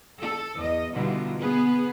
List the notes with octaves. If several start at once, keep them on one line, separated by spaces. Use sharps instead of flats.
A4
E2 D#5
B2 D3 E3 G3 D#4 F4
B3 G#4 B4